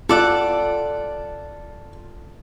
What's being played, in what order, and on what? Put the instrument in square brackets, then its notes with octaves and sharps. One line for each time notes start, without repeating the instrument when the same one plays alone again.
[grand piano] F4 [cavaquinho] A4 D5 F#5